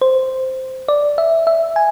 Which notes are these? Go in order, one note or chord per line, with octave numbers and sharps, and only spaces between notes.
C5
D5
E5
E5
G#5